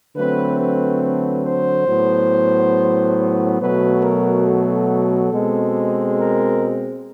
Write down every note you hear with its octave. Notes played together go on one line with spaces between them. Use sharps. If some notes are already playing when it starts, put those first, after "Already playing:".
D3 F#3 A3 C4 B4
B4
B4
C5
A2 F#3 B3
B2 F#3 A3 B4
A#4
A4
B2 G#3 C4
A#4